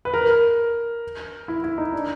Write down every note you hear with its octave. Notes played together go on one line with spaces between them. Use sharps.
B4
A#4
E4
E4
D#4
D4